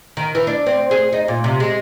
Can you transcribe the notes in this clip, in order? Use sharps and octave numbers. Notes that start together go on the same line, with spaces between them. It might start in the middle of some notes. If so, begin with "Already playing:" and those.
D#3
E3
D4
C4
G#4
D#4
A#2
C3
G#3